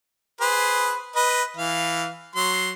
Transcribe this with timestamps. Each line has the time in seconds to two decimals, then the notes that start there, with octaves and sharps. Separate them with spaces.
0.41 G#4 B4 C5
1.16 B4 D#5
1.57 E3 F5
2.36 F#3 C6